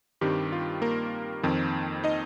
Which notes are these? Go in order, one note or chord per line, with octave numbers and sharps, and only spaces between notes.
G2 D#3 G3 C4 G4
F4
A#3 A#4
F2 D#3 C4
D#4 D#5